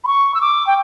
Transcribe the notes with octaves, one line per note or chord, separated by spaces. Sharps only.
B5
C#6
E6
D6
G5